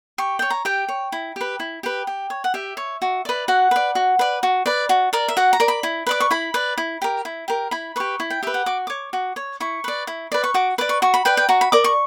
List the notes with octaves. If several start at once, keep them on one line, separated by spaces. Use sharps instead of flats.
G4 C#6
C#5 G5
A#5
G4 G5
C#5
E4
G4 B4
E4
G4 B4
G4
C#5
F#5
G4 E5
C#5
F#4
B4 D5
F#4 F#5
B4 D5
F#4
B4 D5
F#4
B4 D5
F#4
A#4 D5
E5
F#4 F#5
A#5
A#4 D5
B5
E4
B4 D5 D6
C#6
E4 B5
B4 D5
E4
G4 A#4
E4
G4 A#4
E4 B5
G4 B4 C#6
E4
G5
G4 B4 E5
F#5
F#4 D6
C#5 D6
F#4
C#5
E4 C#6
B4 D5
E4
B4 D5
C#6
F#4 D6
B4 D5 D6
C#6
F#4 C#6
B5
B4 D5 G5
G5
F#4 A#5
B5
A#4 D5 D6
C#6